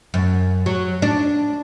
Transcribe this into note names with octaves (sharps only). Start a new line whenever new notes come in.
F#2
F#3
D4